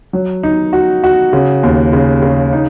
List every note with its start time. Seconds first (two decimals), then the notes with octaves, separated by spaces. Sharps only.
0.13 F#3
0.43 D#4
0.73 F#4
1.04 F#4
1.33 C#3
1.63 D#2
1.93 C#3
2.22 C#3
2.53 D#4